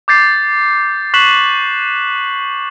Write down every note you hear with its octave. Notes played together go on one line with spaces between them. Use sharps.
D6 G6 A6 C7
C#6 F#6 B6 C7 E7 F#7